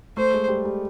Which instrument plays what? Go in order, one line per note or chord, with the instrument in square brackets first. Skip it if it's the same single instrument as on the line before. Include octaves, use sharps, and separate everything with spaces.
[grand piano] A3 [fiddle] C5
[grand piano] G#3
G3
G3